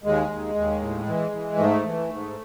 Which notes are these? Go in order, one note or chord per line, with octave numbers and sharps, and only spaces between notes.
D#2 G#3
D#2
D#2
A2
E3
E3
G#2 A3
E3
G#2